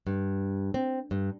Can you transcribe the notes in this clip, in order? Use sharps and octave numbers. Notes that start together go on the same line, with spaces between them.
G2
C4
G2